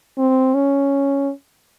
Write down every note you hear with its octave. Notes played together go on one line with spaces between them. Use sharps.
C4
C#4